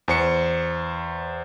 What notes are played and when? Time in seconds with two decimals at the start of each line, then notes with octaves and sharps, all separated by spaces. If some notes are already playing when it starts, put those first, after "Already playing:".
0.08 E2 C5 C#7